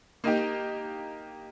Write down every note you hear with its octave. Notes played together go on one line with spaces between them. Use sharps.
A#3 D#4 G4